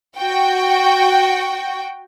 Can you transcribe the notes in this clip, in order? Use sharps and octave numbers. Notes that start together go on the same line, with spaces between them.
F#4 G5